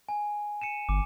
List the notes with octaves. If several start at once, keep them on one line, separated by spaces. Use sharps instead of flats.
G#5
C#7 D#7 E7
G1 D6